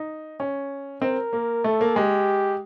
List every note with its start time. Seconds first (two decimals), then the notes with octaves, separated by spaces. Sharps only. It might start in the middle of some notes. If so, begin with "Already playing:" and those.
Already playing: D#4
0.40 C#4
1.02 C4 A#4
1.33 A#3
1.64 A3 A4
1.81 A#3
1.96 G#3 G4